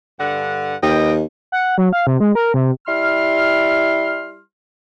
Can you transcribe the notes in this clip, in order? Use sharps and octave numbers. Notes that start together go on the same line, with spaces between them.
G2 D3 F#5
D#2 B4 D#5 G5
F#5
F#3
F5
C3
G#3
A#4
C3
G3 E4 C6 F6